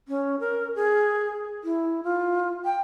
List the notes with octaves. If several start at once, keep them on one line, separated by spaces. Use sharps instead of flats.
C#4
A#4
G#4
E4
F4
G5